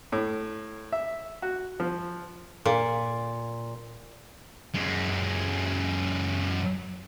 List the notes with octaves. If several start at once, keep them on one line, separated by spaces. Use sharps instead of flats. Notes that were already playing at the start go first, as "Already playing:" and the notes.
A2
E5
F#4
F3
A#2
F#2 G#3